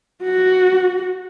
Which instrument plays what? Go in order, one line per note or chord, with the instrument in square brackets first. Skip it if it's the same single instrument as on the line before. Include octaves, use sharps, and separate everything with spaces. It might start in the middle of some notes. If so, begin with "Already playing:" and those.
[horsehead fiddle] F#4